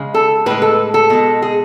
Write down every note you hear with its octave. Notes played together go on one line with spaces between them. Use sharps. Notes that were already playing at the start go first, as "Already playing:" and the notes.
Already playing: C#3 G#3
A4
A2 G#3 B4
A4
A4
B2 G#3
G#4